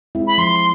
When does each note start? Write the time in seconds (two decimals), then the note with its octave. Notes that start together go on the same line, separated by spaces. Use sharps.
0.15 G#3 C4 E4
0.27 B5
0.38 F3 C6